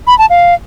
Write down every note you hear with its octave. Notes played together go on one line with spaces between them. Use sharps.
B5
A5
F5